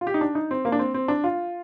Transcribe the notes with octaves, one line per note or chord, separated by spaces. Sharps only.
F4
G4
D#4
D4
D#4
C4
A#3
D4
C4
C4
D4
F4